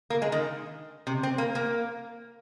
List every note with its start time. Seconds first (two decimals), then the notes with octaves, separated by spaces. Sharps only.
0.10 A#3
0.22 G#3
0.32 D#3
1.07 C3
1.23 C4
1.38 A#3
1.55 A#3